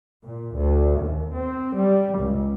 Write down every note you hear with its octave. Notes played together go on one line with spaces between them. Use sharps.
A#2
D2
D#2
C4
G3
C#2